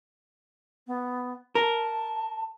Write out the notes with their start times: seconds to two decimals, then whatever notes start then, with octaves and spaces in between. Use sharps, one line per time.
0.87 B3
1.55 A#4 A5